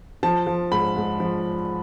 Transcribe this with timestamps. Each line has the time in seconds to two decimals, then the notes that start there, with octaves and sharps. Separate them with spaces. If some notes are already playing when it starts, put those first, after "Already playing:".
0.23 F3 A5
0.47 F3
0.72 G#2 B5
0.96 G#2
1.20 F3